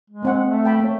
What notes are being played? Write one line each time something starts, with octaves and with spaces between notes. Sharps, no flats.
G#3
A#3 C4 F#5
A3
G5 A5 B5
A#3 C#5